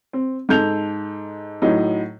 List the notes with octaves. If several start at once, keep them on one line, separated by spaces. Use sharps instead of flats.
C4
G#2 A4 G6 F7
A2 F#3 D#4